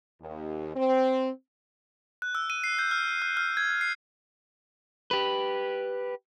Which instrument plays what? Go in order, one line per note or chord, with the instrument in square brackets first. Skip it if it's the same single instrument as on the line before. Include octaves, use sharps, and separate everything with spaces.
[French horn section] D#2
C4
[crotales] F#6
E6
D#7
C7
G6
F6
F6
F6
G#6
C7
[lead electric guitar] G4 B4